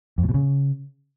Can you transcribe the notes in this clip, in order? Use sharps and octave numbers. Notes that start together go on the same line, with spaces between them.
F2
A2
B2
C#3